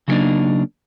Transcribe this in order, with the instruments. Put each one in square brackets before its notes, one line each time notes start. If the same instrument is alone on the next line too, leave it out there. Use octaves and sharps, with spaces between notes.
[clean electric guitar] C#3 F#3 G3 A#3 D4 D#4